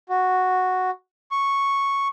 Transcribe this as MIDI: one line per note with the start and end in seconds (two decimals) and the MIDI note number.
0.09 0.90 66
1.31 2.08 85